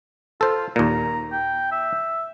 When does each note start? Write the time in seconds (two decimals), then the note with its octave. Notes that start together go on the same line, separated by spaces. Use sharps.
0.41 F4 A4 C5
0.76 D#2 A#2 A#5
1.32 G5
1.72 E5